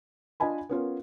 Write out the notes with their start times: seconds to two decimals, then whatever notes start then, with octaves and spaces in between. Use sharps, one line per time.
0.40 D4 F4 D#5 G#5 B5
0.69 B3 C#4 F4 A#4